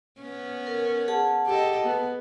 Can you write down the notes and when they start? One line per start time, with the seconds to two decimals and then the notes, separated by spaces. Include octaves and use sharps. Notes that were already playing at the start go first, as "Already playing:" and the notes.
0.20 B3 C#4
0.67 A#4
1.08 G#4 F#5 A5
1.46 G4 A4 D#5
1.84 B3